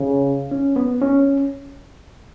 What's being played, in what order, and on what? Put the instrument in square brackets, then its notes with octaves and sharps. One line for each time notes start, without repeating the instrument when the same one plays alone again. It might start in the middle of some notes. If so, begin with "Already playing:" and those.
Already playing: [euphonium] C#3
[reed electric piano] C#4
B3
C#4